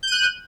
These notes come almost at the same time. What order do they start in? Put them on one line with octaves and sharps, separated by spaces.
G6 D#7 F#6